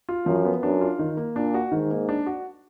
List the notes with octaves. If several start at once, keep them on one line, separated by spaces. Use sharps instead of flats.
F4
F#2 F3
B3
F#2 D4
F4
D#3
A#3
A#2 D4
F#4
G#2 D#3
A#3
D4
F#4